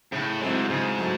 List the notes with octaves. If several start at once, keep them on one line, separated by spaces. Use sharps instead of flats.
A2 C#3
G#2 F#3 A3 C4 E4
G#2 C#3
F#3 A3